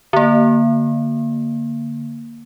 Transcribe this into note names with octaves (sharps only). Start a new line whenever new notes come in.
D3 A#3